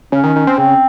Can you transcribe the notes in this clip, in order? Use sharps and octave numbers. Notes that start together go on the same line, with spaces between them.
C#3 C#4
D#3
D#3
C4
C#3 C4